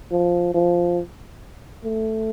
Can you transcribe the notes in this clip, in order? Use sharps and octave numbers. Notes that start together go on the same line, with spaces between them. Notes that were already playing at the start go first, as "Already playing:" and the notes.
F3
F3
A3